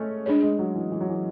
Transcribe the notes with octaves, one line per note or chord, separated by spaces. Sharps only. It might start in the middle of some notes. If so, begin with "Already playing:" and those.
Already playing: G#3 A3 C#4
G#3 D4 G#4 C#5
G#3
F#3
E3
E3
F#3
E3